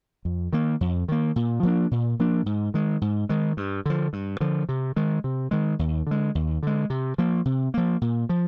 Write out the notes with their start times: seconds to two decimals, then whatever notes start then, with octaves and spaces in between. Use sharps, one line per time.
0.25 F2
0.53 D#3 A#3
0.81 F2
1.08 D#3 A#3
1.36 A#2
1.63 F3 A#3 D4
1.91 A#2
2.19 F3 A#3 D4
2.46 G#2
2.74 D#3 G#3
3.01 G#2
3.29 D#3 G#3
3.57 G2
3.86 D3 F3
4.13 G2
4.41 D3 F3
4.69 C3
4.96 D#3 G#3
5.24 C3
5.51 D#3 G#3
5.79 D#2
6.07 D3 G#3
6.35 D#2
6.63 D3 G#3
6.90 C3
7.18 F3 A#3
7.45 C3
7.74 F3 A#3
8.01 A#2
8.29 F3